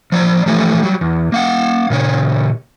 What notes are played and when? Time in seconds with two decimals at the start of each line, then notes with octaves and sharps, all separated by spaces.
0.12 F3 D5 A#5
0.46 E3 F3 A3 G4 A4 G#5
0.82 F#3 G3
1.01 E2
1.32 A#3 F5 F#5
1.90 A#2 C#3 C#5